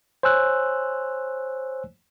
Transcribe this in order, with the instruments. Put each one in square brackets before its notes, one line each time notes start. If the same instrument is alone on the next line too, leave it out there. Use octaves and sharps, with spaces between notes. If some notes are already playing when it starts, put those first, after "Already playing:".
[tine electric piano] C5 C#5 G#5 E6 F#6